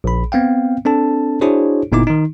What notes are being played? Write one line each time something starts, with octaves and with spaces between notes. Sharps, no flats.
A#1 B5
B3 C4 F5 G5
C4 D4 A4 A5
D4 E4 F#4 G#4 C5 C#5
G1 A#2 B3 D#4 E4 D6
D#3 D#4